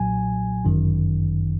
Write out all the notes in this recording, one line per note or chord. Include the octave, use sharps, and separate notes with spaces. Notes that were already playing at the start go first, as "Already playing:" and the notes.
Already playing: B1 A#2 F#3 G#5
G1 F#2 D#3